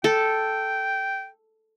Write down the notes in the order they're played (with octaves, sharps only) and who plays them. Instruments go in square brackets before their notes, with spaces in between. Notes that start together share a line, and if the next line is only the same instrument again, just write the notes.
[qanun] A4 [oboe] G5